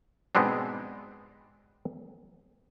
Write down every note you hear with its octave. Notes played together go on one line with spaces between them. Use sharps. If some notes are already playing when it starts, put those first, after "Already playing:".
G#2 B2 G#3 B3 C4 D4